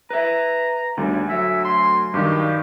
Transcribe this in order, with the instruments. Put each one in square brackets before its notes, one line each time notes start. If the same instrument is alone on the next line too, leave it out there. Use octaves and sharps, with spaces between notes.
[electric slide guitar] B4 E5 [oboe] A#5
[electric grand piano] D2 [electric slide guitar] D3 D#3 G3
[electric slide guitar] F#3 [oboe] E5
[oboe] C6
[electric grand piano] G2 D#3 [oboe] G4